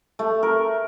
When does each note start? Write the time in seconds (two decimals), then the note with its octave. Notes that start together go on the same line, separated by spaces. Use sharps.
0.19 A3
0.43 A#4